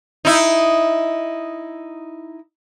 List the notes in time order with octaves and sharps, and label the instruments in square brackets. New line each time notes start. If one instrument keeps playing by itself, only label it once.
[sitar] D#4 E4